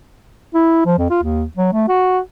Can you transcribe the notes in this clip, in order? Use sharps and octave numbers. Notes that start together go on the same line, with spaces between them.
E4
F3
F2
F4
D#2
F#3
A3
F#4